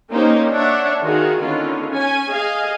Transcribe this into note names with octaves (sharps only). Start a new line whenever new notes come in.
A#3 C#4 D#4 G4 C5
D4 C#5 E5 F#5
D#3 F4 F#4 G#4
D3 D#3 B3 C#4 F4
C#4 G#5
G#4 D#5 F5 G#5